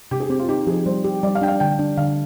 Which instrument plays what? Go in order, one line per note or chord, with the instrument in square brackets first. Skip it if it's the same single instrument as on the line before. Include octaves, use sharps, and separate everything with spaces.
[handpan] C3 [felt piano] G4
[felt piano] G#4
[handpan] C4 [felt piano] G4
[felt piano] F4
[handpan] D#4 [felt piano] G4
[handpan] F3 [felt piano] G#4
[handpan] G3 [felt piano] C5
[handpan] G4
[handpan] G3 [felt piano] D5
[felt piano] F5
[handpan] D4 [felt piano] G5
[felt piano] F5
[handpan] D3 [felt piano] G5
[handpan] D4
[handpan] D3 [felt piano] F5